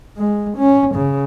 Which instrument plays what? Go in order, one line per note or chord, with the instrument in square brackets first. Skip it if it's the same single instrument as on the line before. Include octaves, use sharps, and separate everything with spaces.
[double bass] G#3
C#4
C#3